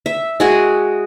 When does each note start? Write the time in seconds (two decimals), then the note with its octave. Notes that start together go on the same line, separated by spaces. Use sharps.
0.06 E5
0.40 G#3 F#4 G#4